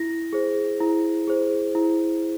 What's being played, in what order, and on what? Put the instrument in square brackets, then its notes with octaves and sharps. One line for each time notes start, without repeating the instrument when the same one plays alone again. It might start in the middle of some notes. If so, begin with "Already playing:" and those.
Already playing: [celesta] E4 A#6
G#4 C5
E4
G#4 C5
E4